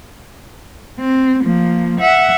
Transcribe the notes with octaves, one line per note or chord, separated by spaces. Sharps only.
C4
F3 A#3
E5 F#5